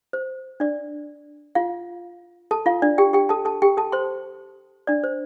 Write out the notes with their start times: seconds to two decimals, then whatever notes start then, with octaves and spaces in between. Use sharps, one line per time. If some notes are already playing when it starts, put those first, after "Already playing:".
0.13 C5
0.60 D4 D5
1.55 F4 F5
2.51 A4 A5
2.66 F4 F5
2.82 D4 D5
2.98 G4 G5
3.13 G4 G5
3.29 A4 A5
3.45 A4 A5
3.62 G4 G5
3.77 A4 A5
3.92 C5 C6
4.87 D4 D5
5.04 C5